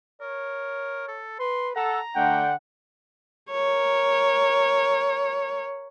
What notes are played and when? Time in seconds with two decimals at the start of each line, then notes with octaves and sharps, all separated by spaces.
0.21 A#4 C#5
1.08 A4
1.40 B4 C6
1.76 A4 F#5 A#5
2.16 D3 A3 D4 F#5 G5
3.51 A#4 C#5